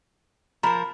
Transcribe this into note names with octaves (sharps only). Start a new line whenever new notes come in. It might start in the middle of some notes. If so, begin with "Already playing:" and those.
F3 A#4 A#5 B5